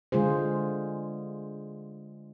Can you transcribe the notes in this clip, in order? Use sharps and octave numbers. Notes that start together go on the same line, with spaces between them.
D3 G#3 F4 G#4 C5